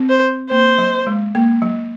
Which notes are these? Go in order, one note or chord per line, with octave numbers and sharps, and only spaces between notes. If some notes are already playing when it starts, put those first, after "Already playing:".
Already playing: C4
C5
A#3 C5
F#3
G#3
A#3
F#3